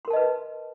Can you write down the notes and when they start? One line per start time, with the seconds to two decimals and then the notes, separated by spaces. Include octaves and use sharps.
0.05 C6
0.08 A#4
0.10 A5
0.13 D#5
0.16 B4